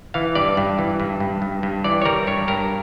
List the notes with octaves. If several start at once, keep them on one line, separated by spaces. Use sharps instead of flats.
E3 F5
G2 D5
G2
E3
G2
G2
G2
G2
E3 D5
C#5
G3 A#4
G2 C#5
G2 A#4